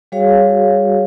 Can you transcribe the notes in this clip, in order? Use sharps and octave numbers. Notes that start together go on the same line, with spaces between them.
G3 F#4 G#4 C#5 F5